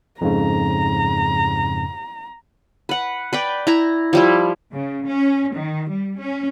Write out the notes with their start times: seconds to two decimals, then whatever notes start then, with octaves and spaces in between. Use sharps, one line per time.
0.21 F2 G#2 C#3 A#5
2.89 B4 F#5
3.33 B4 D5 G5
3.67 E4 A#5
4.13 F3 G3 E4
4.72 C#3
5.06 C#4
5.54 D#3
5.89 G3
6.19 C#4